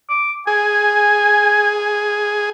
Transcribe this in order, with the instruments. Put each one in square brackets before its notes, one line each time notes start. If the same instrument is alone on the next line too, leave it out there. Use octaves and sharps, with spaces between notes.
[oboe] D6
[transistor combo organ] G#4 [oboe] G#5